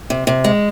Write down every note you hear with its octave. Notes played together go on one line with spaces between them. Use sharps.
C3
C3
G#3